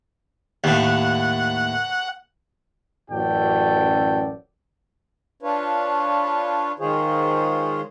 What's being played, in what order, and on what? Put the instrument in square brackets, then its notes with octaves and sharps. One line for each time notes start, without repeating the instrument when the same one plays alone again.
[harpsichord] D#2 A2 [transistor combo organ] F#5
[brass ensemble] A1 F#2 F#4 A4 D5 G5
[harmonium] D4 F4 B4 C#5
D#3 G#3 F4 G#4 C5 C#5